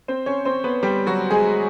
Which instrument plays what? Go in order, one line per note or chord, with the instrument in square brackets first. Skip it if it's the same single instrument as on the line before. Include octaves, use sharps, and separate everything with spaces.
[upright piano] C4 C5
C#4 C#5
C4 C5
B3 B4
G3 G4
F#3 F#4
G#3 G#4